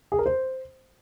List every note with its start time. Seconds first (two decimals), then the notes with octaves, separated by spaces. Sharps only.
0.12 G#4
0.19 A#4
0.26 C5